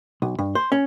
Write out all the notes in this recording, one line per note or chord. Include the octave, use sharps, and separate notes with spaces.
B1
G2
C5
C#4